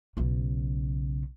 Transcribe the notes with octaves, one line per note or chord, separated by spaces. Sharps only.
B1 C#3